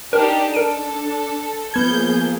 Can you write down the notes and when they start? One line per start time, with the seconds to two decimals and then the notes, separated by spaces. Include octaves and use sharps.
0.13 D4 D#4 G4 A#4
0.54 D4 A4 A#4 D7 D#7
1.74 F3 A#3 B3 G#4 G6 G#6